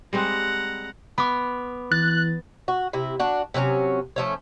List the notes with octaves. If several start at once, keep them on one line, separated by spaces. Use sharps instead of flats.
G3 G#3 C4 F#5 A#5
B3 B5 D6
E3 F#6 A6
F#4
C3 E4
D4 F#4
C3 F#3 C4 C#4
F3 A3 C#4